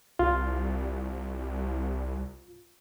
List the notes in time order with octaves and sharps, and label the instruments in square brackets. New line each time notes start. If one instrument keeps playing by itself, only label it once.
[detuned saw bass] C2 [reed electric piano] F4